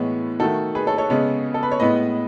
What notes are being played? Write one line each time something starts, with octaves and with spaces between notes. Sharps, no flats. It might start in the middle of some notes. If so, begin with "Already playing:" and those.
Already playing: A2 E3 G#3 B3 C#5
D#3 A3 F#4 A4
G#4 B4
A4 C#5
A4 C#5
C#3 G#3 B3
A4
B4
C#5
A2 G#3 B3 B4 D#5